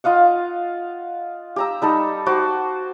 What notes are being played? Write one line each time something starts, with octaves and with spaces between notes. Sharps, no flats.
F4 D#5 F5 F#5
G4 A#5 E6
G3 D#4 A4
F#4 C5 D6